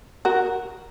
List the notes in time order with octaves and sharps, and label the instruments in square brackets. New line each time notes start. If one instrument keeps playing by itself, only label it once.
[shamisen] F#4 A#4